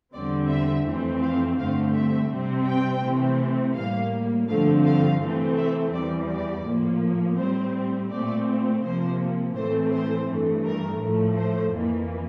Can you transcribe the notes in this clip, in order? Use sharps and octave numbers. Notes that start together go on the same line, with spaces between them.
E2 D3 G3 C4 D5
E5
F2 E3 A3 C4
F5
G2 D3 A3 C4 F5
E5
C3 G3 C4
G5
C3 E3 A3 C4
A2 G3 A#3 F5
G2 D3 F3 A3 C4 F5
F5
C3 E3 A3 C4
E5
E2 E3 G3 D5
D5
A2 F3 A#3
A2 G3 C4 C5
A#2 A3 C4 D5
C3 F3 A#3 C5
A2 E3 A3 C4 C5
C5
G2 E3 A3
A#4
A2 F3 A3
C5
F2 E3 A#3